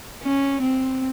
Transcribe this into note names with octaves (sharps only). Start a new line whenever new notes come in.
C#4
C4